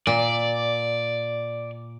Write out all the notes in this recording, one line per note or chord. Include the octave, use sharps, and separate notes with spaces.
A#2 D5